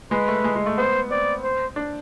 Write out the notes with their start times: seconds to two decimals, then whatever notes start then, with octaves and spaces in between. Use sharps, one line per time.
0.11 G#3 B4
0.28 A3
0.44 G#3
0.55 G#3
0.66 A3
0.78 B3 C5
1.11 C4 D5
1.43 C5
1.76 D4